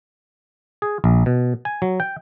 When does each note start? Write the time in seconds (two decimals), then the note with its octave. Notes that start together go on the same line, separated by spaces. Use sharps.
0.82 G#4
1.04 A#1
1.26 B2
1.65 G#5
1.82 F#3
2.00 G5